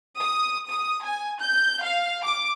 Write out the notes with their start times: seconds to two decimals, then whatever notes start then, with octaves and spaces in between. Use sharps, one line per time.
0.21 D#6
0.69 D#6
1.03 G#5
1.40 G6
1.82 F5
2.22 D6